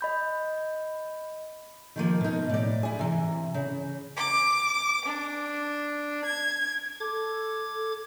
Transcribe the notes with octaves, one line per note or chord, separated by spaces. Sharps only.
D#5 B5 G6
D#3 F3 A#3
B2 D#4
A2 D5
E4 G#4
C3 E3
C#3
D6
D4
G#6
A4 D6 G#6